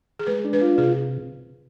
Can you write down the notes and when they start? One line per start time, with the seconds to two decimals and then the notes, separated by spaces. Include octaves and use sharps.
0.19 G#4
0.27 G#3 B4
0.45 D4
0.53 B4
0.61 F4
0.78 C3 G#4